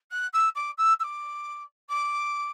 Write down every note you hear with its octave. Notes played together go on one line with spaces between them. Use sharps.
F#6
E6
D6
E6
E6
D6
D6